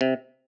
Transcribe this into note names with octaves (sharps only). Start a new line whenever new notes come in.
C3